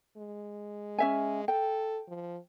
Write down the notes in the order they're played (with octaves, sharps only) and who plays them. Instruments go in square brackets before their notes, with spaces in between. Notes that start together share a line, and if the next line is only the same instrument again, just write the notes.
[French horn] G#3
[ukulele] C#4 E5 G#5
[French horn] A4 [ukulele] G5
[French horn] F3